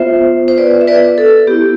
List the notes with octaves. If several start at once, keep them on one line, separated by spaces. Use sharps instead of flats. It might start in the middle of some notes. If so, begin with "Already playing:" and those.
Already playing: B3 F4 C5 E5
C5
B4 D5
E5
B4 D5
A4
B3 E4 G4